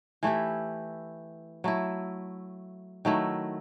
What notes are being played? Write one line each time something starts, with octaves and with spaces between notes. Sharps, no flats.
E3 A3 E4 G4
F#3 A3 E4
D#3 F#3 A3 E4